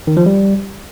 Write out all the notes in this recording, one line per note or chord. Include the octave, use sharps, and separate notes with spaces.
D#3
F3
G3